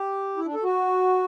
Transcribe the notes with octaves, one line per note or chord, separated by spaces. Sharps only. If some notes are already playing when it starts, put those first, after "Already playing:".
Already playing: G4
E4
D4
A4
F#4